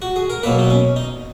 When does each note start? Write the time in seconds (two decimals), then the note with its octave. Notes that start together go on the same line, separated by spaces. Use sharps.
0.02 F#4
0.16 G#4
0.30 A#4
0.43 B2 F#3 A#3 B4
0.59 D#4
0.70 C#4
0.96 D#4